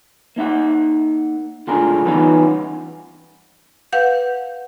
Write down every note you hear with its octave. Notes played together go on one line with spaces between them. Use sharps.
A#3 D#4 E5 F#5
C#2 A2 D3 F4 G#4 A#4
E3 G3 B3 C#4 D#4 F4
B4 F5 F#5 G6